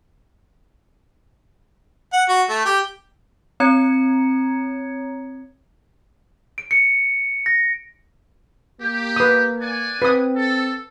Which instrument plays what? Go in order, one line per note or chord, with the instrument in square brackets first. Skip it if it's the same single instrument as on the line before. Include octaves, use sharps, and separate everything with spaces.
[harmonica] F#5
F#4
A3
G4
[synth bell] C4 C#5 A#5 G#6 C#7
[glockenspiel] D7
C#7
A#6
[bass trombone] A#3 [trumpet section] G4
[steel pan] B4 D#6
[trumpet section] D5 F#5 G#5
[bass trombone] C4 [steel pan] B4 D#6
[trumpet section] A4